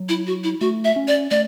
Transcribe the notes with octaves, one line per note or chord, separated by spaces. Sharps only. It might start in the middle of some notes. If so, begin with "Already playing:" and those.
Already playing: F#3
E4
F#4
E4
A3 F#4
E5
C#4
D5
A3 D5